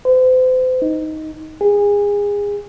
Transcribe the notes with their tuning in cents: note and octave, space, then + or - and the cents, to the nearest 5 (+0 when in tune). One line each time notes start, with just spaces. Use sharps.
C5 -40
D#4 +5
G#4 -25